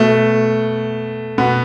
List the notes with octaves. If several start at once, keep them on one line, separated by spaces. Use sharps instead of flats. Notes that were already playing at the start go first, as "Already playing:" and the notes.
Already playing: B2 A3
B2 B3